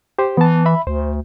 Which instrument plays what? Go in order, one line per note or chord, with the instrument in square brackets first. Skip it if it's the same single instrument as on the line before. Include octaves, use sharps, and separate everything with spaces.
[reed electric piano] G4 C5
[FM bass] E3 [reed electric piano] B3 A5
[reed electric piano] E5 B5
[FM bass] D2 [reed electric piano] C5